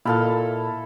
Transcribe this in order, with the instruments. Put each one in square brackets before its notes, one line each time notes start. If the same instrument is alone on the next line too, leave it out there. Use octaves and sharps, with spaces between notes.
[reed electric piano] A#2 F6 [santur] E4 A4 F5